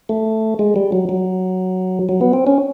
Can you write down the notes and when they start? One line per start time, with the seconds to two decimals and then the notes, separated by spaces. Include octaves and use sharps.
0.09 A3
0.59 G#3
0.76 G3
0.92 F#3
1.09 F#3
2.09 F#3
2.21 B3
2.33 C4
2.47 C#4